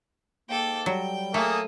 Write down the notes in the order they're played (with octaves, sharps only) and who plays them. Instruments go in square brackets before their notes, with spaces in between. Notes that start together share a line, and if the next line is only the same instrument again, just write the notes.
[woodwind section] G#2 A#3 [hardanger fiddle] A4 G5
[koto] F#3 [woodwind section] G3 [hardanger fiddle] G5
[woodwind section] C#3 D#6 [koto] A3 [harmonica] A#3 G#4 A4